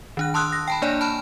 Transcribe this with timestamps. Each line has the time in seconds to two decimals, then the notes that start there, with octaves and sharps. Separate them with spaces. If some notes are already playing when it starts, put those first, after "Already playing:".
0.17 D#3 D4 F#6
0.34 A5 C6 D#6 E6 F#6
0.52 A#6
0.68 G5 A5 B5
0.82 A#3 D4 C#5 D5 G#5
1.01 A5 B5 F6